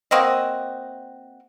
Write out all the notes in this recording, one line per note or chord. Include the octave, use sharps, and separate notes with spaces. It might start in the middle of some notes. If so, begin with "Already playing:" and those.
A#3 C4 F#4 D#5